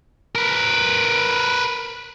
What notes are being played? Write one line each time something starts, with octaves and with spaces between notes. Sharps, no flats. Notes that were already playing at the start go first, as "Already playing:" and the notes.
A#4 B4